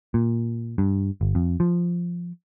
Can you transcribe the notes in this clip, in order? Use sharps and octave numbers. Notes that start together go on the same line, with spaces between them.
A#2
G2
G1
F2
F3